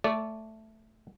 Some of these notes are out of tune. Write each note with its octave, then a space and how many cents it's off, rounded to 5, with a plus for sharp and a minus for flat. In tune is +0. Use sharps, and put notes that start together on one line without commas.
A3 +0 D5 -15